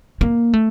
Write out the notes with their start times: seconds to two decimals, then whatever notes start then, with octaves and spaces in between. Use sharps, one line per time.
0.21 A#3
0.53 A3